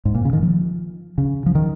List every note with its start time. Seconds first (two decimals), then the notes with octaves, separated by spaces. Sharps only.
0.05 G#2
0.15 A#2
0.25 C#3
0.33 D#3
0.42 F3
1.18 C#3
1.46 F3
1.55 D#3